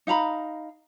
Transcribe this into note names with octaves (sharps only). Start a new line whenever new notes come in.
D#4 F5 A#5 B5